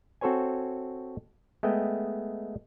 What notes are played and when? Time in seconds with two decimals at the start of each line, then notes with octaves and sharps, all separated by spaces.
0.21 C4 F#4 A4 C5 C#5 G#5
1.63 G#3 A3 B3 D#5 G5